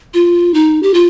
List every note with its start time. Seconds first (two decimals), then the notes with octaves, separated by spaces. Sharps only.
0.14 F4
0.54 D#4
0.83 G4
0.94 F4